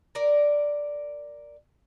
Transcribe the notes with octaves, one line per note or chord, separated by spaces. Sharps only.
A#4 D5